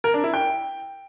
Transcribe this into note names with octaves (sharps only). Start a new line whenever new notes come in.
A#4
D4
E4
G5